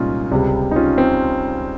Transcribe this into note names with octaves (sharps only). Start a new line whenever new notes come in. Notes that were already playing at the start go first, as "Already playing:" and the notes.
Already playing: C2 A#2 G#3 C#4 D#4 F4
C#2 C3 G3
D#4
C#4 F4
C4